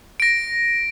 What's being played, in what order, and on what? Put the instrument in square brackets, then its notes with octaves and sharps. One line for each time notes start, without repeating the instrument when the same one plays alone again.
[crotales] A#6 D7